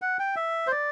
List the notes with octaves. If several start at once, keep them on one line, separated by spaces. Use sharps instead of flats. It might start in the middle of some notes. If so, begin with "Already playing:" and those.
F#5
G5
E5
C5
D5